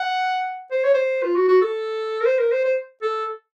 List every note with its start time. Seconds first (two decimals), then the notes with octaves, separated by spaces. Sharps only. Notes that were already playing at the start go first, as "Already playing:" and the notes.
Already playing: F#5
0.71 C5
0.84 C#5
0.94 C5
1.23 F4
1.36 F#4
1.48 F#4
1.62 A4
2.21 A#4
2.26 C5
2.39 A#4
2.52 C5
2.64 C5
3.02 A4